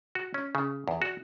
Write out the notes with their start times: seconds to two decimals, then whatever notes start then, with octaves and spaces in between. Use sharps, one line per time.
0.15 F#4
0.34 C#4
0.55 C#3
0.88 E2
1.02 F#4